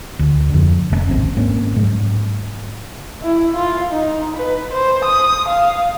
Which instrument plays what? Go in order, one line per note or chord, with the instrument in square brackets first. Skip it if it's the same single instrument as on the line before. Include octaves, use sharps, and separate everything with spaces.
[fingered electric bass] D2
F2 D3
F1 C3 C#4
D1 G#1 C4
G#2 A#3 C4 C#4
G#2 F#3
[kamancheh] E4
F4
D#4
B4
C5
D#6
F5